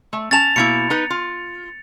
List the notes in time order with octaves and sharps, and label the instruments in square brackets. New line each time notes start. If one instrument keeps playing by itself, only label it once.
[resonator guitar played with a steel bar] A3
[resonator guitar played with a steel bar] C#4 A5 [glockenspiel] A6 F7
[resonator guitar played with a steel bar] B2 A#3 E4 [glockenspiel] C#7
[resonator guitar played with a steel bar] D#4 B4
F4